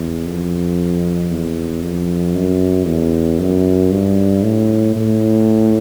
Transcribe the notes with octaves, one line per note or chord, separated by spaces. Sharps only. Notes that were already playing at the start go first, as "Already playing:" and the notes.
Already playing: E2
F2
E2
F2
F#2
E2
F#2
G2
A2
A2